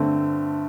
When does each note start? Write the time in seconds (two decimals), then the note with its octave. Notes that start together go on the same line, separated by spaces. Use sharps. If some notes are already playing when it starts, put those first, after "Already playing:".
Already playing: G2 D3 A3 C4